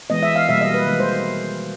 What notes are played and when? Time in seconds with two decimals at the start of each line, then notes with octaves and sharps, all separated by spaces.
0.10 E3 G#3 B3 D#5
0.23 E5
0.36 F5
0.49 B2 G3 A#3 E5
0.61 D#5
0.74 B4
0.87 D#3 G#3 B3
1.00 C5